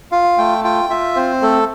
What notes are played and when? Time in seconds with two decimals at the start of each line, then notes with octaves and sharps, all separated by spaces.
0.12 F4 F5
0.38 A3 G5
0.64 F4 G5
0.90 F4 E5
1.16 C4 C5
1.42 A3 A4